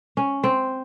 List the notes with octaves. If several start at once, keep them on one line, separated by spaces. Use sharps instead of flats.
C#4
C4